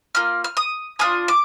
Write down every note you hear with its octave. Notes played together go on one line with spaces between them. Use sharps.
A#3 F4 F6
F6
D#6
D4 F4 G#4 D#6
D6